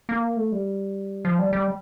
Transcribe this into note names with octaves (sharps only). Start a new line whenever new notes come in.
A#3
A3
G3
F3
G3
G3